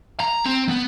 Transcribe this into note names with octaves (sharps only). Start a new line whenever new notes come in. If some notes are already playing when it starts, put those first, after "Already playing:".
A#5
C4
B3